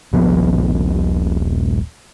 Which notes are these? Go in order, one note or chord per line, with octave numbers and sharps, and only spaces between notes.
D#1 A#1 F3 B3